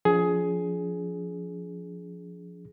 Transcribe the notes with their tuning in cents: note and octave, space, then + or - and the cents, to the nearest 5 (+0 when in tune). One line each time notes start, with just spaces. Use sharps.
F3 +0 D4 -40 G#4 +15